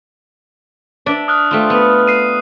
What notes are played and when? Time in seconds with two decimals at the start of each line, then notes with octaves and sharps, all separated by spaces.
1.06 D4 D5 E5
1.28 D#6 F6 F#6
1.51 A3 C4 F4
1.70 B3
2.07 C7 D#7